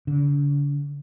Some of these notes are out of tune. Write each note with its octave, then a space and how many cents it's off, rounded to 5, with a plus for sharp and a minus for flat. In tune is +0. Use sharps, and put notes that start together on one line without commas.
D3 -45